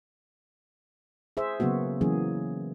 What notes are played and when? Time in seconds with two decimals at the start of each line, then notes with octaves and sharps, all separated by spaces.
1.37 G#4 C5 E5
1.60 C#3 F#3 A#3 B3 F#4
2.01 E3 F#3 A#3 C#4 G#4